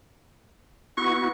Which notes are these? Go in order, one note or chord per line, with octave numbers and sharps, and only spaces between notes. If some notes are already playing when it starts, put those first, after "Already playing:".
B3 E4 F#4 C#6